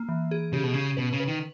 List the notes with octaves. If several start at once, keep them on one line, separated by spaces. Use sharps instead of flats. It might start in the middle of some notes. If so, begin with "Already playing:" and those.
Already playing: A#3
E3
G#4
C#3 G4
B2
C#3 C#4
B2 B4
C#3
B4
D#3